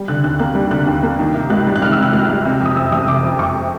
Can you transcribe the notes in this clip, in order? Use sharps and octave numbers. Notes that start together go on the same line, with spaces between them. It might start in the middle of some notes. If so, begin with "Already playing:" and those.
Already playing: G3
D3 F#6
D#2 F#6
A#3 F#6
G3
D3 F#6
D#2
A#3
D#3
C3
C#2 F#6
G3
F#6
D#3 F6
E6
C3 F#6
C#2 F6
G3
C3
F2
D#6
F#1 E6
F#1 D#6
C3 D6
F2
F#1 C#6